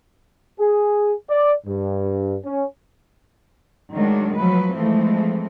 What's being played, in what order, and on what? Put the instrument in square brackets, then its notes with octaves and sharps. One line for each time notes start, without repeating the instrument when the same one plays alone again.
[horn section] G#4
D5
G2
C#4
[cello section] D#3 F#3 G#3 A3 D4
F3 F#3 B4
E3 F3 G#3 A3 C4